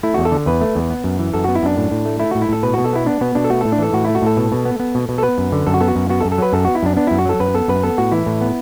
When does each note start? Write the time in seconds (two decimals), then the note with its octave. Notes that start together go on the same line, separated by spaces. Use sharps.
0.03 A3 E4
0.14 E2 F#4
0.25 A4
0.32 D3
0.46 E2 B4
0.61 A3
0.76 E2
0.90 B3
1.04 F#2
1.19 E3
1.34 F#2 A4
1.44 B3 F#4
1.55 E4
1.63 F#2 D4
1.77 A2
1.91 A2
2.05 A3
2.20 A3 E4
2.31 A2 F#4
2.42 E4
2.49 A2 A4
2.63 B2 B4
2.74 B2 F#4
2.84 A4
2.93 B3 E4
3.06 B3 D4
3.21 B2 B3
3.35 B2 D4
3.44 A4
3.50 A3 F#4
3.61 A2 A4
3.72 D4
3.79 E3 A4
3.93 A2 F#4
4.04 A3 E4
4.15 F#4
4.22 A2 A4
4.37 B2
4.52 B2
4.65 B3
4.80 B3
4.95 B2
5.09 B2
5.18 A4
5.23 B3 B4
5.38 F#2
5.52 D3
5.67 F#2 A4
5.74 F#4
5.81 B3 A4
5.88 F#4
5.96 F#2
6.09 B3 F#4
6.20 A4
6.25 F#2
6.32 A4
6.38 F#3 B4
6.53 F#2 A4
6.65 B3 F#4
6.75 E4
6.83 F#2 D4
6.97 B3 D4
7.07 F#2 E4
7.19 F#4
7.26 F#3 A4
7.40 F#2 B4
7.54 B3 A4
7.68 F#2 B4
7.83 B3 A4
7.98 A2 F#4
8.12 E3 E4
8.26 A2
8.41 B3